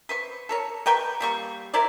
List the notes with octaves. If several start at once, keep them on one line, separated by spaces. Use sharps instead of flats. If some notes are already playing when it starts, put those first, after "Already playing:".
B4 C5 C#6
A4 A#4 C#5
A#4 B4 G5 C#6
G3 A#3 C#6
E4 A#4 C5 D5